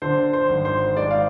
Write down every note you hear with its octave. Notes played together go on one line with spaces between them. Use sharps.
D3 C5
C5
G#1
C5
G#3 D5
F5